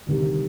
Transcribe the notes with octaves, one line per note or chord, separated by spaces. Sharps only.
D2 C3 D#3 G3